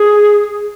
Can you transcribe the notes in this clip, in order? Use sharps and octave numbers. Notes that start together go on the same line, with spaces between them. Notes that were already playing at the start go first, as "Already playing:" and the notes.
Already playing: G#4